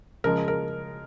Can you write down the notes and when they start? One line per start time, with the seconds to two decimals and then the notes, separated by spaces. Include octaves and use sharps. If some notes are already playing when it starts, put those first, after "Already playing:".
0.24 C#3 F3 G#3 A#4
0.48 A#4